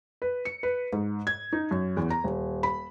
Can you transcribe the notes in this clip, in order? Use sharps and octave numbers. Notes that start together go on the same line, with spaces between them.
B4
C#7
B4
G#2
G#6
D#4
F#2
E2
A#5
D#1
B5